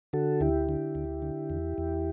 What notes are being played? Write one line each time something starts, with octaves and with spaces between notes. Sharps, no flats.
D3 F#4 A4
D2 E4 G4
D3
D2
D3
E2
E2